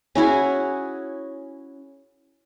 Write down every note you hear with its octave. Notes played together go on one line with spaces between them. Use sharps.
C#4 E4 F#4 G#4